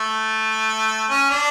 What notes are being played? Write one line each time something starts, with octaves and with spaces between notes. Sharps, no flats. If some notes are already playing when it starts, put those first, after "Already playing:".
Already playing: A3
C#4
D4